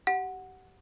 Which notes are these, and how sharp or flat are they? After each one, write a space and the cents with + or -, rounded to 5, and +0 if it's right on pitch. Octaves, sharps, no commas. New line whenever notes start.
G4 -25 F#5 +0